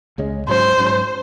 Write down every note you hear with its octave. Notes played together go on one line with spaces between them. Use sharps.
C#2 C#3 G#3 C#4
G#2 F#3 C#4 C5
G#2 F#3 C#4